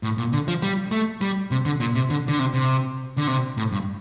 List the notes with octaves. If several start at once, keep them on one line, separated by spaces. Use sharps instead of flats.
A2
A#2
D3
F3
G3
A3
G3
C3
D3
A#2
C3
D3
D3
C3
C3
D3
C3
A2
G2